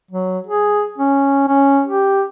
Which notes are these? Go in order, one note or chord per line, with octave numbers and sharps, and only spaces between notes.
F#3
G#4
C#4
C#4
G4